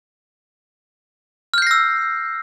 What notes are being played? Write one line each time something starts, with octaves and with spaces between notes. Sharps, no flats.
E6 F6 G6 A#6 C7